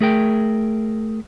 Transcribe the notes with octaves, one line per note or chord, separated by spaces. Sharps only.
A3 G#4 A#4 G5